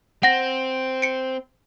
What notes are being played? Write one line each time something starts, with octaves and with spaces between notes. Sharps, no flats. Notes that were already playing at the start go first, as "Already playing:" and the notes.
C4 F#5 A#6
C#7 D7